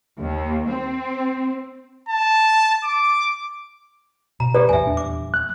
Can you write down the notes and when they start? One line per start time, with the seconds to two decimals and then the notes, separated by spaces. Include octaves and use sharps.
0.20 D#2
0.69 C4
2.09 A5
2.84 D6
4.40 B2 A#5
4.55 G4 A4 B4 D5
4.69 A1 E2 E5 G#5
4.83 D#1 D4
4.97 D6
5.34 F#6